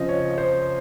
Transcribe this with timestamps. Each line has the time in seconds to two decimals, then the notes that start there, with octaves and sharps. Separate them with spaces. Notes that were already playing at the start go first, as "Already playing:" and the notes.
Already playing: C#3 F3 C4 C5 D#5
0.09 C#5
0.38 C5